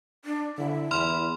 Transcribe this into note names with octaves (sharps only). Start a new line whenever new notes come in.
D4
D3 E4
E2 B5 C6 F6